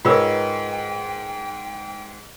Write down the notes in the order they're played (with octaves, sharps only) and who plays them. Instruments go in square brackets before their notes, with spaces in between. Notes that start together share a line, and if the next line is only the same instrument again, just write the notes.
[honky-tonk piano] G#2 [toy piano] F4 B4 E6 [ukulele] A#4 C#5 D#5 [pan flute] G5